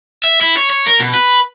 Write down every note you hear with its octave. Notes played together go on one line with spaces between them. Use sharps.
E5
E4
C#5
C#5
A#4
B2
B4